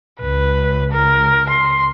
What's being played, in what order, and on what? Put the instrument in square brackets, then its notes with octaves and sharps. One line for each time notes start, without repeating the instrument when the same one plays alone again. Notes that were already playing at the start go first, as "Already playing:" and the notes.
[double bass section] C#2 [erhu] B4
[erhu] A#4
C6